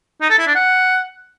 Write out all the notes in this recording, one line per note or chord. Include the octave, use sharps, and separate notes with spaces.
D#4
A4
E4
D4
F#5